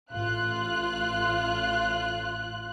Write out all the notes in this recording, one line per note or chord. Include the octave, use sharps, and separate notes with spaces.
A1 F4 F#6